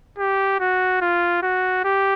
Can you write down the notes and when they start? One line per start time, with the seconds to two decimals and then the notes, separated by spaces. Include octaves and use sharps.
0.19 G4
0.60 F#4
1.02 F4
1.43 F#4
1.84 G4